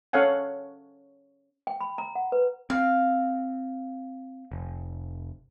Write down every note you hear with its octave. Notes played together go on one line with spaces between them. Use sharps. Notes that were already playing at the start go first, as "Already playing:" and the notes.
C#4 A4 C#5 F5 F#5 G#5
G5
B5
A#5
F#5
B4
C4 F5
F1